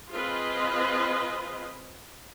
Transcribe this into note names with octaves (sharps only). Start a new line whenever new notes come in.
C4 F4 G#4 B4 D#5